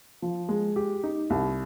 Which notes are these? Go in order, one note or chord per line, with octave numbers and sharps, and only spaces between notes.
F3
G#3
G4
D#4
C2